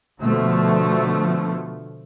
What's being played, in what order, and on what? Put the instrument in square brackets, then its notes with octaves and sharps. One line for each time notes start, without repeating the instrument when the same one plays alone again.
[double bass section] B2 D3 F3 A3